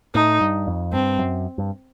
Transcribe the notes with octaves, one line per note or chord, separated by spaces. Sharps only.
A2 D#4
G2
F2
G2 C4
F#2
G2